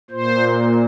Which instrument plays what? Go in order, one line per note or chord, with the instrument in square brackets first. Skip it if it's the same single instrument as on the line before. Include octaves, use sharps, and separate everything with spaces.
[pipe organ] A#2 C5